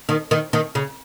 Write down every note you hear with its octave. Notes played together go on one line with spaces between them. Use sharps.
D#3
D#3
D#3
C#3